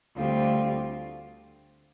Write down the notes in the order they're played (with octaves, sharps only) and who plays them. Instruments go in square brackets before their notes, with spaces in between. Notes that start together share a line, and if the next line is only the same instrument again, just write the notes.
[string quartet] D2 D3 G3 C4 F4